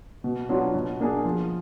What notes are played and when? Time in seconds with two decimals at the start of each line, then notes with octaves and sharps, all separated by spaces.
0.24 B2
0.49 F#3 B3 D4 F4
0.75 B2
1.00 A#3 D4 G#4
1.25 F3